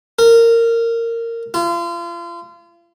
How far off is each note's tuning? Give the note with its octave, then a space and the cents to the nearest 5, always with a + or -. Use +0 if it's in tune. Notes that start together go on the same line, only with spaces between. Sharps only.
A#4 -15
F4 -35